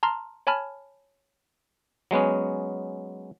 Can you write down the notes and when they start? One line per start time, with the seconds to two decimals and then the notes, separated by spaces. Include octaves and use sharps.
0.03 A5 A#5 C6 F6
0.47 C#5 G#5 A5 B5 F6
2.11 F#3 G#3 B3 C#4